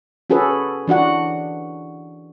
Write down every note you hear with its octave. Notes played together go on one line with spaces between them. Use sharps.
C#4 F#4 G#4 A4 B4
E3 D4 F#4 F#5